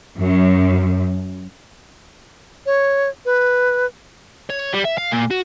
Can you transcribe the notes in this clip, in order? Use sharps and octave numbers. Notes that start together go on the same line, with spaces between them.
F#2
C#5
B4
C#5
G3
E5
F5
A#2
F#4